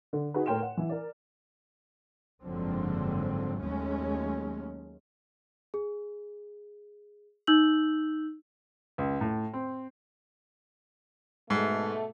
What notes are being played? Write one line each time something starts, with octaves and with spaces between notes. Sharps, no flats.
D3
D#4 F#4 G#4 B4
A2 A#4 C#5 G5 C6 E7
F#5
E3 E4
A#4 D5
F#1 G#2 D3 F3 F#3 C4
D#2 F#3 G#3 A3 C#4
G#4
D#4 E6 G6 F#7
C#2
A2
C4
G#2 B2 A3